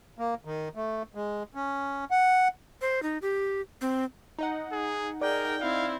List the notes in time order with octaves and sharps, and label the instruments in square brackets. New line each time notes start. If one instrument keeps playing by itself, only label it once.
[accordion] A#3
D#3
A3
G#3
C#4
F#5
[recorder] C5
D#4
G4
C4
[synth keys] D#4 D#5 F#5
[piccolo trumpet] G#4
[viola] G#4 G5 [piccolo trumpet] A#4 [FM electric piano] D5
[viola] C4 E4 [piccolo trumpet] F5